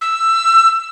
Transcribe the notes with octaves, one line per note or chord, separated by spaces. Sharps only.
E6